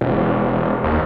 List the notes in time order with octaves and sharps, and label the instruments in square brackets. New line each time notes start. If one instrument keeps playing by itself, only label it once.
[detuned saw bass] E1
D#2